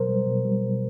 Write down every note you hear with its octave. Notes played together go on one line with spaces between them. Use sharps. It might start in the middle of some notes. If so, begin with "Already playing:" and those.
Already playing: B2 F#3 A#4 C5
G3
B2
G3
B2